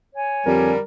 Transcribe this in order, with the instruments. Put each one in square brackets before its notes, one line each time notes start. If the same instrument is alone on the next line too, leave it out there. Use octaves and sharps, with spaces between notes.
[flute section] C#5 G#5
[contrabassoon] F2 [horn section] D3 G3 [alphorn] A#4